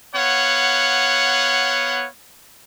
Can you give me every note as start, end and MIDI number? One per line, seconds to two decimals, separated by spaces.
0.15 2.07 59
0.15 2.07 73
0.15 2.07 77
0.15 2.07 78